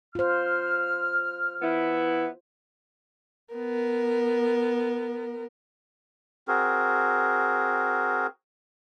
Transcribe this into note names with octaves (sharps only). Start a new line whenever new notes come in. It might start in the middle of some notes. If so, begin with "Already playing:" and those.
F4 C5 F6
E3 B3 E4
B3 A#4
C4 F#4 G#4 A#4